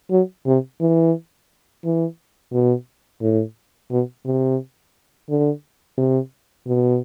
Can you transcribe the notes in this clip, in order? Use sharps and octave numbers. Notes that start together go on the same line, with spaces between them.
F#3
C3
E3
E3
B2
A2
B2
C3
D3
C3
B2